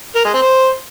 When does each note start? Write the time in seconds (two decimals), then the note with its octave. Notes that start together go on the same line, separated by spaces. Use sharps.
0.16 A#4
0.25 G#3
0.34 C4
0.43 C5